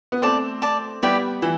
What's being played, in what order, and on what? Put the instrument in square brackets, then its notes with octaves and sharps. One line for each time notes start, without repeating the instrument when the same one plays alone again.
[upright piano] B3
[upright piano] A3 C4 [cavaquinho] D5 A5 D6
[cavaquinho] D5 A5 D6
[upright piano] G3 B3 [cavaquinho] E4 G4 D5 G5
[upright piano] E3 [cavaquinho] E4